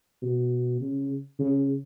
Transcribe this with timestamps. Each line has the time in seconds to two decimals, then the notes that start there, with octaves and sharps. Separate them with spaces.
0.22 B2
0.81 C#3
1.39 C#3